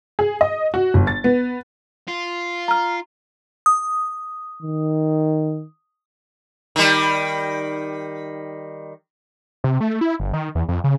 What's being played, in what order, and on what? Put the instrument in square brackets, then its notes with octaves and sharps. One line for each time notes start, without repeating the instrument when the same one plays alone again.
[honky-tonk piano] G#4
D#5
F#4
G1
A6
B3
[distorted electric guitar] F4
[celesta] A#5 F6
[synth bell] D#6
[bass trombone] D#3
[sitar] D#3 G3
[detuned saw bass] C3
A3
E4
G1
D#3
E2
F2
C#3